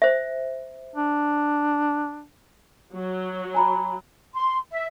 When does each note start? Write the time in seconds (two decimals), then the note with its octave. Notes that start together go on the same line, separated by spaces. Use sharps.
0.02 C5 E5
0.96 D4
2.94 F#3
3.54 G#5 A#5 B5
4.35 C6
4.70 E5